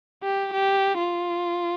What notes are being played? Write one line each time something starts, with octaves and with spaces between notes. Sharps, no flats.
G4
G4
F4